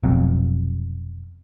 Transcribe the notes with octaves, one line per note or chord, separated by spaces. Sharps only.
F1 B1 F2